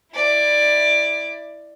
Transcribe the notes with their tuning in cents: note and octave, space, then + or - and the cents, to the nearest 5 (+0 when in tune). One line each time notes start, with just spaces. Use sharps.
E4 +0 D5 +10